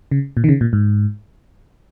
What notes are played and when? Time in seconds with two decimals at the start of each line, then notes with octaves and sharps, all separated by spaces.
0.11 C#3
0.37 A#2
0.44 D#3
0.49 C#3
0.61 A#2
0.73 G#2